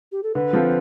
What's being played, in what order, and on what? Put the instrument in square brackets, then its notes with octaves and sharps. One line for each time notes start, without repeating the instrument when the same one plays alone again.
[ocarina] G4
A4
[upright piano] D3 [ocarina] B4
[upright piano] F3 C4 F4 A4